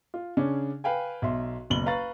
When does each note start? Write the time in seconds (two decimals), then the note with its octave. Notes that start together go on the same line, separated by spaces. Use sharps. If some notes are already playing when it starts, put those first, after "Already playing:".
0.14 F4
0.37 C#3 C#4 D4
0.84 B4 F5 G5 G#5
1.22 B1 E5 C6
1.70 F#1 B1 B5 F#7 G7
1.86 B4 F5 A#5 C#6 A6